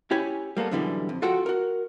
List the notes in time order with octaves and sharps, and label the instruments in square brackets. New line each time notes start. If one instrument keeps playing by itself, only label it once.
[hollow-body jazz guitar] C#4 E4 G4 C#5 G#5 B5
G3 A#3 B3 A4
F#2 B2 D3 E3 G3
F2
F4 F#4 A4 F#5 G5
F#4 A#4